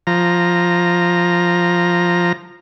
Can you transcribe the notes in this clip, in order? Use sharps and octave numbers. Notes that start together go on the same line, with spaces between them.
F3 A#5